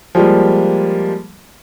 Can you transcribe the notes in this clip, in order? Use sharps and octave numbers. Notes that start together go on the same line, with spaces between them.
F3 G3 G#3 A#3